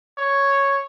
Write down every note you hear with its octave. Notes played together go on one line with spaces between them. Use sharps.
C#5